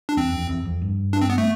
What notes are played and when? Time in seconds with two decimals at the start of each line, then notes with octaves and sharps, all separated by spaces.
0.09 D4
0.17 E2 C4
0.33 F2
0.49 E2
0.65 F2
0.82 G2
1.13 D4
1.22 C4
1.30 B3
1.38 A3